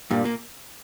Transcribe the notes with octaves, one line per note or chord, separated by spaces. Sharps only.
G2 A#2 G3
A#2 A#3